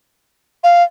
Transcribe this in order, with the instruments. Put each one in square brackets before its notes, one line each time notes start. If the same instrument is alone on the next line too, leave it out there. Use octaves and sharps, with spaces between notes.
[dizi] F5